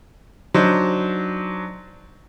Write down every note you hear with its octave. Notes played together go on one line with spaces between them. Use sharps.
F#3 D4 D#4 C5